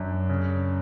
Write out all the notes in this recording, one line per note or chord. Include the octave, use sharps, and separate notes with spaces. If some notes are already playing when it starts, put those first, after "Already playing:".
Already playing: F#2 D4
C#3